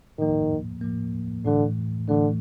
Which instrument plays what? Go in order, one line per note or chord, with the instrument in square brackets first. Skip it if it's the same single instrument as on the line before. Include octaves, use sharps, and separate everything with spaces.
[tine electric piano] A2 F3 A#3 [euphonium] D#3
[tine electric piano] A2 F3 A#3
[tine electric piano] A2 E3 A3 [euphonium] D3
[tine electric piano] A2 E3 A3 [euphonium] D3